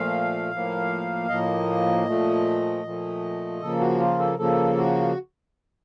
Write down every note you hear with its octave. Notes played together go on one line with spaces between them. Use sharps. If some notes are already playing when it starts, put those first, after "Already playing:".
Already playing: A#2 F3 A3 F5
A2 F3 A#3
A2 F3 A#3 D#5
A#2 F3 A3
A#2 F3 A3
C#3 F3 A#3 A4
F#4
F4
A4
C#3 F3 A#3 A4
F#4